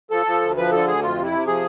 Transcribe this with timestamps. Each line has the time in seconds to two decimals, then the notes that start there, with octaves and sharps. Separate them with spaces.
0.11 F3 A4
0.26 F3
0.41 D2
0.57 F3 B4
0.71 D3 A4
0.86 D2 G#4
1.02 F2 F4
1.16 C3
1.24 E4
1.32 C3
1.47 F3 G#4